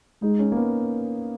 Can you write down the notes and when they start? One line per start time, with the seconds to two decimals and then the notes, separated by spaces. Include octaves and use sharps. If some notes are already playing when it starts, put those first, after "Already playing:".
0.22 G#3 D#4
0.39 C#4
0.52 A#3
0.56 B3